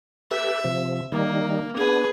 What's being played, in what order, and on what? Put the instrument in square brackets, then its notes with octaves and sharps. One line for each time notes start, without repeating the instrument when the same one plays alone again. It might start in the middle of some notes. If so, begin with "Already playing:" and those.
[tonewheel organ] G4 A4 B4 [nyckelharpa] E5
[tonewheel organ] C3 F3
[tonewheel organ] D#3 G3 D#4 [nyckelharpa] A#3
[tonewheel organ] B3 D4 [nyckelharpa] G#4 B4